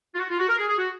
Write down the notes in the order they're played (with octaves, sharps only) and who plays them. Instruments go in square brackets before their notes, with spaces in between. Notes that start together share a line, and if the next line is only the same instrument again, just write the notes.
[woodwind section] F4
F#4
F4
F#4
A#4
G#4
G#4
F#4